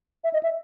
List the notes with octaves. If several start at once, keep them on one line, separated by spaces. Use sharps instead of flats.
E5
D#5
E5